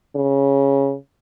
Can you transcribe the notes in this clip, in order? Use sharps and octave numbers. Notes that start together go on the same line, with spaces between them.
C#3